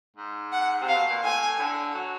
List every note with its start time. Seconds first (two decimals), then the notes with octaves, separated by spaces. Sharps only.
0.17 G#2
0.52 F#5
0.81 C3
0.88 F5
0.95 B2
1.10 A#2
1.23 A2 G#5
1.59 D3
1.95 F#3